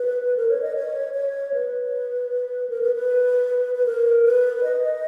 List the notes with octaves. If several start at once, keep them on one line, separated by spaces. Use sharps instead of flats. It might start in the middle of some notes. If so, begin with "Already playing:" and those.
Already playing: B4
A#4
C#5
D#5
C#5
C#5
B4
A#4
B4
B4
B4
A#4
B4
D#5